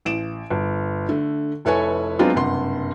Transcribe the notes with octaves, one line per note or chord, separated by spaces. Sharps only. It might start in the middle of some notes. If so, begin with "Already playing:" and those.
A1 D7 E7
G1
D3 A3
F1 E4 A4 B4 C#5 G#5
F#3 G#3 B3 C4 D4 F4
F#1 G2 C3 F#5 C6